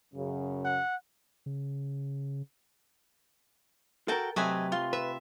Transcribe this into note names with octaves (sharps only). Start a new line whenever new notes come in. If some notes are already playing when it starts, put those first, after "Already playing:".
F#2 C#3
F#5
C#3
F#4 A4 A#4 G5 A5
C3 F#3 A3 B4 D#5 G#5
F4 C6
B4 E5